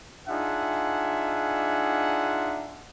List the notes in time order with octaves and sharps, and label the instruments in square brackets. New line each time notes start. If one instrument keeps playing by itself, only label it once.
[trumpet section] D4 D#4 F4 G#4 E5 F#5